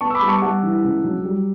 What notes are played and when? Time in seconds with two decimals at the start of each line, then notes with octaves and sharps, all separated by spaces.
0.01 B3 A5 C#6
0.10 E6
0.15 B5 D6
0.22 G3
0.28 A5 C#6
0.42 G3 F#5 A5
0.63 E3
0.84 C#2
1.04 F#3
1.25 G3